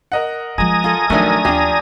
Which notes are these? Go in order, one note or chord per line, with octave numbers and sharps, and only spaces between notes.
A#4 D#5 F#5
F3 G#3 G#5 A#5 D#6
F4 A4
A#1 D#3 F3 F#3 A3 D4
D#2 F3 D4 G4